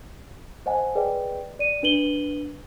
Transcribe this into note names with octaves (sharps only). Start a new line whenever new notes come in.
C5 D#5 F#5 G#5 A5
G#4 B4 D5 D#5 G5
D5 D#7
D4 B4 D#7 F#7 G7